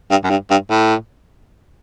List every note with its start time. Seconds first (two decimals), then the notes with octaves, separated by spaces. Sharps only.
0.10 G2
0.24 F#2
0.30 G2
0.51 G2
0.70 A2